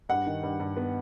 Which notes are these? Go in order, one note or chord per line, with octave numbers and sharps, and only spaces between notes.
G2 F#5
D#3
G2
G2
B3